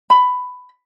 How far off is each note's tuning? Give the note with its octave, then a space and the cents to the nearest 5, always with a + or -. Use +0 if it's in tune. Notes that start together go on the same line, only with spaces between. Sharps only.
B5 +10